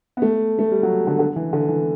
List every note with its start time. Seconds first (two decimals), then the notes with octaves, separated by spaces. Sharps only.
0.17 B3
0.22 A3
0.59 A3
0.71 G3
0.83 F#3
1.07 D3
1.19 D3
1.36 E3
1.53 D3
1.68 E3